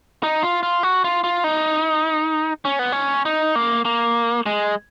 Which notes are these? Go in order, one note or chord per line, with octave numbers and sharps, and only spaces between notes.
D#4
F4
F4
F#4
F4
F4
D#4
C#4
B3
C#4
D#4
A#3
A#3
G#3